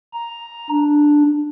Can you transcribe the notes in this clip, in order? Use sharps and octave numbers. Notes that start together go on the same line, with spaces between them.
A#5
D4